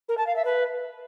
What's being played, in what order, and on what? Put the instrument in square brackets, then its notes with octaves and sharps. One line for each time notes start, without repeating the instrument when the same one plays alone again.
[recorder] A#4
A5
F5
E5
B4